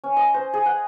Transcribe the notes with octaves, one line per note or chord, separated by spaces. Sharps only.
C#4
D#5
C5
G#4
F#5